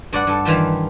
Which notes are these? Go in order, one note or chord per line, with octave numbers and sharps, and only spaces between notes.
G2 D5 F#5
G2 A4
D#3 E3 G3 F4 G4 A5